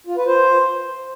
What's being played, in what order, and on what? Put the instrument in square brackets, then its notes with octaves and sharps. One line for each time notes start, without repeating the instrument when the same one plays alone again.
[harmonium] F4
B4
C5